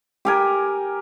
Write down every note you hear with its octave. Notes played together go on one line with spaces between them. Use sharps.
G4 A#4 G#5